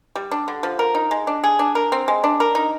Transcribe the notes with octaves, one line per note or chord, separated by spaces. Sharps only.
G3
D4
D3
F3
A#4
D#4
G#3
D4
G#4
D4
A#4
C4
G#3
D4
A#4
D#4